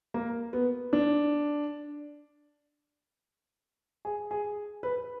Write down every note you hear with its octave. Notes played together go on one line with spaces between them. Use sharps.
A#3
B3
D4
G#4
G#4
B4